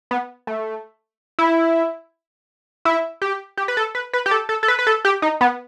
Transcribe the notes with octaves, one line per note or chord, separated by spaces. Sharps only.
B3
A3
E4
E4
G4
G4
B4
A4
B4
B4
G4
A4
A4
A4
B4
B4
A4
G4
D#4
B3